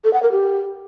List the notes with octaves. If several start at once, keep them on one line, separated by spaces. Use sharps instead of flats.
A4
F#5
A#4
G4